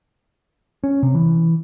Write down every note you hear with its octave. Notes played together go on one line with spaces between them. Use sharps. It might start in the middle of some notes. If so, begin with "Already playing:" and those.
C#4
C3
E3